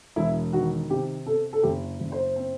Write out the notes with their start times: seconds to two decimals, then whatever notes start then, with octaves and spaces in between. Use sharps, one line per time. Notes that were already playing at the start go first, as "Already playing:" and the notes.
0.16 E1 E4
0.53 D#3 F#4
0.90 C3 G4
1.26 C3 A4
1.53 A4
1.63 F#1 G4
2.00 F#1
2.12 C5
2.36 C4